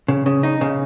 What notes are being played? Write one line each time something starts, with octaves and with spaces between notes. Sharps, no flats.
C#3
C#3
D#4
C#3